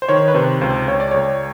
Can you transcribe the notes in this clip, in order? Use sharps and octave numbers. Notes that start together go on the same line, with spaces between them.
C5
D#3 C#5
B4
C3 C5
C#2 C5
C#2 C#5
D5
C#2 C#5